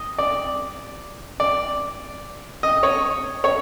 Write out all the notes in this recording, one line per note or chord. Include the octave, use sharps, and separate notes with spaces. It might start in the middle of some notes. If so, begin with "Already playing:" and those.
Already playing: D#5
D5
D5
D#5
C#5
C#5